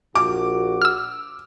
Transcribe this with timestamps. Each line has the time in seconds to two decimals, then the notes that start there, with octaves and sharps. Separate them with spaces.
0.15 A#1 A#2 F#4 D6
0.82 E6 F6